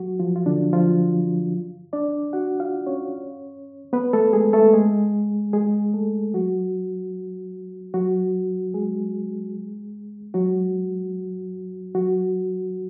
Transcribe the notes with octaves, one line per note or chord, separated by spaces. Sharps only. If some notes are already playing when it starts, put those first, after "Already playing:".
Already playing: F#3 F#4
F3 F4
F4
D3 D4
F3 F4
D4 D5
F#4 F#5
F4 F5
C#4 C#5
B3 B4
A3 A4
G#3 G#4
A3 A4
G#3 G#4
G#3 G#4
A3 A4
F#3 F#4
F#3 F#4
G#3 G#4
F#3 F#4
F#3 F#4